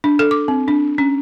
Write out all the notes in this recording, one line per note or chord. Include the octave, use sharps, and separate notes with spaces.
D4
A4
D6
C4
D4
C#4